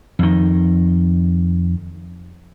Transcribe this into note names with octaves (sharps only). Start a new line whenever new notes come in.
F2 D#3